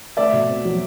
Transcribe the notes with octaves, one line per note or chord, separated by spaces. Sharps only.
A3 D5 E5
B2
C4
F#3